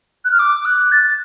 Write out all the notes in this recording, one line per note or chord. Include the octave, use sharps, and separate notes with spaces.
F#6
F6
D6
F#6
A6